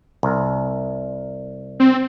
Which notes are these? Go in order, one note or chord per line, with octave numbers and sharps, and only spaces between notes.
C2
C4